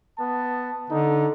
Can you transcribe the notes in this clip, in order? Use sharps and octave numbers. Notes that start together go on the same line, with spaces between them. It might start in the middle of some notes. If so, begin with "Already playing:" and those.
B3 A5
D3 D#4